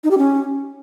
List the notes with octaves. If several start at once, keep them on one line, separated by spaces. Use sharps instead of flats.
D#4
G4
C#4